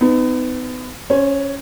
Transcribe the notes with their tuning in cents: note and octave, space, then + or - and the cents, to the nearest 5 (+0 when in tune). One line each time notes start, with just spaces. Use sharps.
B3 +35 D#4 +0
C#4 +0 C5 +30